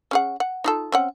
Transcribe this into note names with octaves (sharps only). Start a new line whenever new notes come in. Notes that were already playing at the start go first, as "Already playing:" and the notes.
C#4 G#4 F#5
F#5
D#4 F4 A4
C4 C#4 F#5